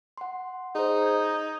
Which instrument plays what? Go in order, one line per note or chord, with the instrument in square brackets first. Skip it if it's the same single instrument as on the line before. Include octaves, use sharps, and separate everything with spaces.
[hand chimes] F#5 C6
[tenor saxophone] D#4 [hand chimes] G#4 C5
[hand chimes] G6 G#6